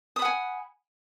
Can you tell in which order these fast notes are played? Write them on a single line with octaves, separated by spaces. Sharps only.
D#6 B5 F#5 G#5